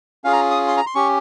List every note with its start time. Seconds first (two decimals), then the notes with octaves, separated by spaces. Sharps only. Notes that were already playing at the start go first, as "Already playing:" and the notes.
0.24 C#4 F4 G#4 F5
0.33 A#5
0.51 D#6
0.68 C6
0.77 A#5
0.87 C6
0.95 C#4 G4 C#6